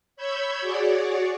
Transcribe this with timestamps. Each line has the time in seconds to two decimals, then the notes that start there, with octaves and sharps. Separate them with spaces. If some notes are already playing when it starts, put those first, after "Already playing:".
0.16 C#5 B5 E6 G6 G#6
0.61 F#4 G#4 C#5 D5